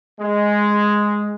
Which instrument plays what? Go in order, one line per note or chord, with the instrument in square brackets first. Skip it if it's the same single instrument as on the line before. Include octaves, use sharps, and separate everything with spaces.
[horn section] G#3